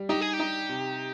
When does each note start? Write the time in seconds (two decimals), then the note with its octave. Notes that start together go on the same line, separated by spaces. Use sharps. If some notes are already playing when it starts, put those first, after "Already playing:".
Already playing: G3
0.09 D#4 G4
0.21 G#4
0.33 G4
0.40 D#4
0.69 C3